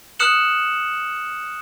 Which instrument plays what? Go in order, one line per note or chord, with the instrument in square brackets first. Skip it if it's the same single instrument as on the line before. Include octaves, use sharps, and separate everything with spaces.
[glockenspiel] D#6 F6 F#6 C#7 E7 F#7